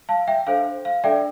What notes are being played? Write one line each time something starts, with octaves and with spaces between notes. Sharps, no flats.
F5 A5
E5 G5
D4 A4 C5 F5
F5
D4 A4 D5 E5 G5